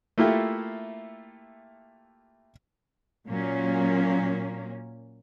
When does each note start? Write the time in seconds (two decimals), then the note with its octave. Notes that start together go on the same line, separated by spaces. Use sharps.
0.18 A3 A#3 E4 F4 G4 A4
3.28 A#2 F#3 A#3 C#4